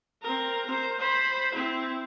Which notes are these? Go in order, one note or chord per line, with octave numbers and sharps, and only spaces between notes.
C4 A#4
A#4 C5
C5 B5
C4 E4